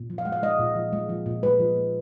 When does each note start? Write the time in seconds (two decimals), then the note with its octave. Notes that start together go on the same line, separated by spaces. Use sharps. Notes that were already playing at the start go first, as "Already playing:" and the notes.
Already playing: A#2
0.10 F3
0.18 F5
0.25 G#3 F#5
0.32 F5
0.43 G#3 D#5
0.59 A#2
0.76 F3
0.93 G#3
1.09 F3
1.26 A#2
1.43 G#3 B4
1.60 F3
1.76 A#2